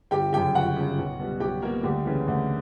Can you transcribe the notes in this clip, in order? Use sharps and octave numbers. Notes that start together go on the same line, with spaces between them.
G1 G4 G5
F#2 C#3 G4 G5
G1 F#4 F#5
F#2 C#3
B1
B2 G3
B1 G4 G5
B2 G3 A#3 A#4
D2 G3 G4
C#3 E3 G3
D2